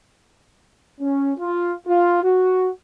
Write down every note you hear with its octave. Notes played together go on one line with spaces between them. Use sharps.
C#4
F4
F4
F#4